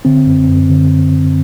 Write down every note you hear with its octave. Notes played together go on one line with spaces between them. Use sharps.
D3 C4
F#2
F#2
D3